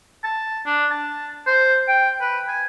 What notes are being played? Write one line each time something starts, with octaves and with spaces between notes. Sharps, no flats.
A5
D4
A5
C5
G5
B4
G#5